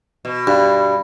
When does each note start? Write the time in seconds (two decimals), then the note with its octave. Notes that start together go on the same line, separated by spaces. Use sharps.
0.25 B2
0.47 G2